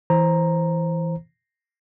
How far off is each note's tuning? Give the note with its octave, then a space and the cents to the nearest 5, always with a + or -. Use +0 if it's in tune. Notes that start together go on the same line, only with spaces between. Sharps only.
E3 -5 C5 +10 A#5 +0